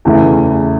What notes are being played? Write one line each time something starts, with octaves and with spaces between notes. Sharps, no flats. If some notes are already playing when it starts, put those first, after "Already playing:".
E2 C#3 E3 A3